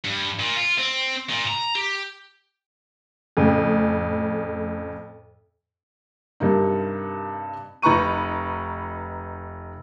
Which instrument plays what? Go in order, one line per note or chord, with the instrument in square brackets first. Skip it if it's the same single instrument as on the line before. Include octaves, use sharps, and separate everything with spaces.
[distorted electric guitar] G2
A#2
F4
C4
A#2
A#5
G4
[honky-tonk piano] F2 A2 C#3
[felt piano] G2 C3 A#3 D#4
[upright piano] F1 D#4 B4 A#5 C#6 D#7